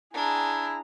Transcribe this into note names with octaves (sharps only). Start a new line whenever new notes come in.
D4 E4 G#4 A#5